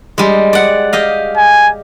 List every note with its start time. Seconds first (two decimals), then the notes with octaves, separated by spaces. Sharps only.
0.18 G3 G#3
0.53 D5 F#5
0.93 G4 D#5 F5
1.37 G#5